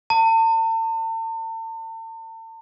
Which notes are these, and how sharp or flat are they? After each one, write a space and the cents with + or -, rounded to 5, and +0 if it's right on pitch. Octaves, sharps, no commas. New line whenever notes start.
A5 +40